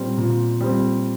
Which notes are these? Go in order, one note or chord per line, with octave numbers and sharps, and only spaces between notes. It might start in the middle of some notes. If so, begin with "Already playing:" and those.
Already playing: A#2 G3 C4
A#2
G3 C4